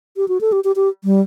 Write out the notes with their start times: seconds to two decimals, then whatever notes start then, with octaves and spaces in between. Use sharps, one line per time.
0.17 G4
0.28 F#4
0.41 A4
0.52 G4
0.64 G4
0.76 G4
1.04 G3